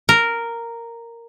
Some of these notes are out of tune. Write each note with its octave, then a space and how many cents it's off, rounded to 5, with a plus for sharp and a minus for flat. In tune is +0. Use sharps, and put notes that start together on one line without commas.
A#4 -5